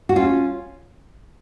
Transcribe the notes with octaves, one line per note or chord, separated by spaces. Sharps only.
F#4
C#4 F4